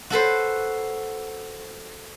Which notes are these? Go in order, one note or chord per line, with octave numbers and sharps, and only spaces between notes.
F#4 A4 B4 C5